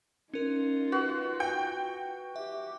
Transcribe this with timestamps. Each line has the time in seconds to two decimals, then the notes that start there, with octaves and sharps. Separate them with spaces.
0.34 C#4 D#4 F4 A#4
0.92 F#4 B4
1.40 G5
2.36 G4 E5